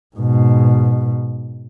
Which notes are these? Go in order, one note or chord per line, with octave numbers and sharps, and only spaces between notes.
G#2 B2